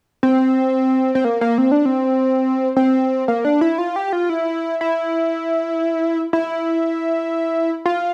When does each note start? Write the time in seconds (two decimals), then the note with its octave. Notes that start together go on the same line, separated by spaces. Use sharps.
0.23 C4
1.15 C4
1.25 A#3
1.41 A#3
1.58 C4
1.72 D4
1.86 C4
2.76 C4
3.28 A#3
3.45 D4
3.61 E4
3.78 F4
3.96 G4
4.13 F4
4.30 E4
4.81 E4
6.33 E4
7.86 F4